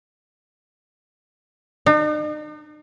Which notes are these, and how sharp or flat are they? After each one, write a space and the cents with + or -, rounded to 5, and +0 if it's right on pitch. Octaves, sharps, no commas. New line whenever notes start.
D#4 -45